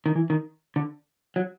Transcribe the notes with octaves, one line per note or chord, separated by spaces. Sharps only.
D#3
E3
D#3
D3
F#3